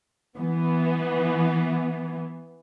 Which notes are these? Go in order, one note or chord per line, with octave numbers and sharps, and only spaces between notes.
E3 B3